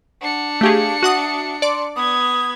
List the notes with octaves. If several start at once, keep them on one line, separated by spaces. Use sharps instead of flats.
D4 F#5 C#7
A3 G4 G#4 F5
F#4 E5 F#5 D#6
D5 C6 D6
B3 D#6 G#6